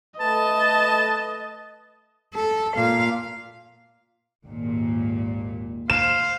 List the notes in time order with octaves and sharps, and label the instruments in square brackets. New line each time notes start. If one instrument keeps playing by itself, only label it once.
[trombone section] A3 A4 B4 [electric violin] D#5 [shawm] A5
[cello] A4
A#2 F5
[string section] G#1 D#2 A#2
[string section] C5 [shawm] F5 [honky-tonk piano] E7